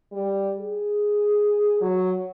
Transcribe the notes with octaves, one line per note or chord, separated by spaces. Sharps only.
G3
G#4
F#3